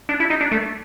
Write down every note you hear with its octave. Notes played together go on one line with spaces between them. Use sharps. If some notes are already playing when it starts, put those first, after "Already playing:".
D4
E4
D#4
D4
A3